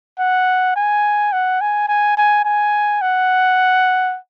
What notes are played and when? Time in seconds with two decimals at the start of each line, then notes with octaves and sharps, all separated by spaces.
0.19 F#5
0.76 G#5
1.33 F#5
1.61 G#5
1.88 G#5
2.17 G#5
2.45 G#5
3.02 F#5